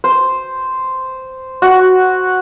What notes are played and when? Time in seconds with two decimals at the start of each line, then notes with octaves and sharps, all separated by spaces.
0.04 C5
1.62 F#4